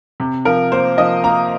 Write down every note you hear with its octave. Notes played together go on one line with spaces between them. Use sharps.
C3
F3 A#4
A#3 C5
F3 D#5
A#3 A#5